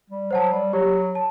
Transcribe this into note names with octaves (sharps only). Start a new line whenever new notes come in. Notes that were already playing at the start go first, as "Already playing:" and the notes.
G3
F#3 C5 F#5 A5
G3
F#3 G4
A5